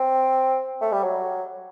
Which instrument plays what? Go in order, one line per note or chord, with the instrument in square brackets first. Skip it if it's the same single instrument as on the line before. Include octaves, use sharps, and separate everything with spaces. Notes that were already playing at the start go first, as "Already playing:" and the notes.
Already playing: [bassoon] C4
A3
G3
F#3